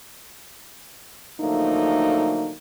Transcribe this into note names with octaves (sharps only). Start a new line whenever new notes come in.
D3 F3 F#3 A3 A#3 D#4